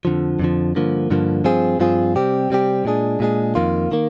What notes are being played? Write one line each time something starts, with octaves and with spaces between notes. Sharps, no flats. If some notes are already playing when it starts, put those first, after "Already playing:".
F2 D3 F3
F2 D3 F3
G2 D3 F3 A#3
G2 D3 F3 A#3
G2 F3 C4 F4 G#4
G2 F3 C4 F4 G#4
C3 G3 C4 G4
C3 G3 C4 G4
A#2 G#3 D4 G#4
A#2 G#3 D4 G#4
F2 D#3 A#3 F4
D#3 A#3